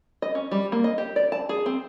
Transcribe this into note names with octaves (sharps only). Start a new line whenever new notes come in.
D#5
C#4
G3
A#3
D#5
G4
D5
A5
G#4
C4